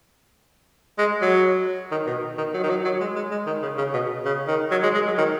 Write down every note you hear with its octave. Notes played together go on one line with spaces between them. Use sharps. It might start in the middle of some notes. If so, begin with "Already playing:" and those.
G#3
F#3
D#3
B2
D#3
F#3
D#3
F#3
F#3
G#3
G#3
G#3
D#3
C#3
C#3
B2
C#3
D#3
F#3
G#3
G#3
F#3
D#3